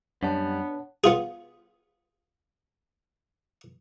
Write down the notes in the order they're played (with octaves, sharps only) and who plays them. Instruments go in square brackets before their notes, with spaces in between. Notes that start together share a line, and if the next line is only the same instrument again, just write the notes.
[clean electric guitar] F#2 G3 [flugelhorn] B3 [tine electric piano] D4 [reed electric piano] C#5 F#5 A5
[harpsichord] B3 F4 G#4